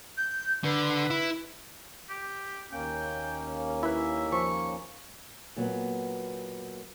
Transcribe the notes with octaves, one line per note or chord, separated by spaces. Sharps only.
G6
D3 B4
E4
G4
D#2 A#3 C#4 G5
E4 B4 E5
F3 C#6
A#2 F#3 A#3 B3